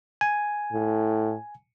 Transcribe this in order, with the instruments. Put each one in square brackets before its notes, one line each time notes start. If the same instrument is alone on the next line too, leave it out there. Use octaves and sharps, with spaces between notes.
[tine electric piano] G#5
[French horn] A2